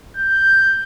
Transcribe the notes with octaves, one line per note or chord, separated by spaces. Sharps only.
G6